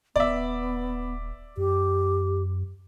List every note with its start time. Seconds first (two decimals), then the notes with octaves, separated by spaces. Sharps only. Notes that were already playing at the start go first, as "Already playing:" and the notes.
0.16 D#1 B3 D5 E5
1.57 F#2 G4